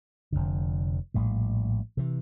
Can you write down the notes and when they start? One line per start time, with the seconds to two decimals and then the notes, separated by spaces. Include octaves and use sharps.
0.32 F1 F2 D3
1.14 A#1 A2 G3
1.97 C3 E3